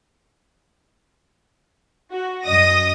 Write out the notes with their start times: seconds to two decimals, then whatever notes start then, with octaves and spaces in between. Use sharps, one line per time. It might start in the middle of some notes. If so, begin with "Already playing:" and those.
2.13 F#4
2.46 F#2 D#5 D#6 A#6